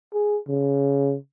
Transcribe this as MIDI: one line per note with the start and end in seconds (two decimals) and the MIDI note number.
0.14 0.38 68
0.48 1.15 49